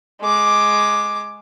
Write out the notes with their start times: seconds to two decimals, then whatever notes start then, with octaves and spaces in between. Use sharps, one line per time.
0.21 G#3 D6